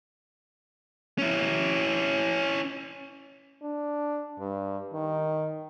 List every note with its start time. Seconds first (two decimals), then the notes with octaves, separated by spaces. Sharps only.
1.18 C#4 E4
3.62 D4
4.40 G2
4.93 D#3